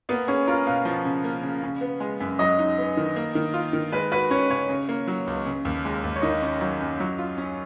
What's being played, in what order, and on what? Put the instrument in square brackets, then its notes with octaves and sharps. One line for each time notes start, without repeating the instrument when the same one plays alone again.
[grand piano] A#3 [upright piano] B3
[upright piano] C#4 [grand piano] G#4
[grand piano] F4 [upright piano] A#4
[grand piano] B2 [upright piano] F5
[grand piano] F3
C#3
A#3
C#3
C#3
B3
G#3
F#2
[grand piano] F#3 [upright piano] D#5
[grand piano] D#4
B3
D#3
A#3
D#3
F4
D#3
[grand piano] G#3 [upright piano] B4
[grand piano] F#4 [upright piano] B4
[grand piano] C#4 [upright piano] C#5
[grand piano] C#3 [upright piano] C#5
[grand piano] C#3
A#3
F#3
C#2
C#3
D#2
G#3
D#2
[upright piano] C#5
[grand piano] D#3 [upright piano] D#5
[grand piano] C#4
F#3
F#2
F#3
F4
C#4